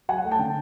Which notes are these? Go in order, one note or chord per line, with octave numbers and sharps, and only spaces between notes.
F#3 F#5 G#5
A3
G5 A5
D3